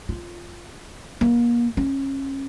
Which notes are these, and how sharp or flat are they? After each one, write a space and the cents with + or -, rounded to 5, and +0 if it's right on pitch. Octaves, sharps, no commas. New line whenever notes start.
F4 -5
A#3 +30
C#4 -25